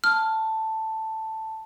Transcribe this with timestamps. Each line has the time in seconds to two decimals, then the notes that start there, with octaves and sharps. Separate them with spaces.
0.04 A5 F6